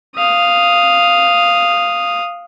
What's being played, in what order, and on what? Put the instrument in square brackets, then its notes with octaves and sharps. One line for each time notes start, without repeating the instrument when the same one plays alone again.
[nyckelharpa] F5 D#6